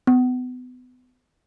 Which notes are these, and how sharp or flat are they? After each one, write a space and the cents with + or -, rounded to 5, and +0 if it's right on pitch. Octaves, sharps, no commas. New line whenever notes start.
B3 +30